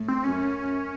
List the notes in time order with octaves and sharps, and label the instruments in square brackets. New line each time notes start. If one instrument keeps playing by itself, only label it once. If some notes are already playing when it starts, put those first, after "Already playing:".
Already playing: [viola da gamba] A2
[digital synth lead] C4
[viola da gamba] F#2 [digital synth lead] C#4